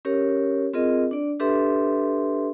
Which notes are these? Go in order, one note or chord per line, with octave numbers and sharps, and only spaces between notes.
C#4 G4 A#4 C#5
C4 F4 G#4 A#4 D#5
D4 D5
D4 G4 A4 B4 E5 C6